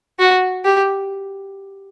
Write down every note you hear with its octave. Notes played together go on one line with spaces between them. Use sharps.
F#4
G4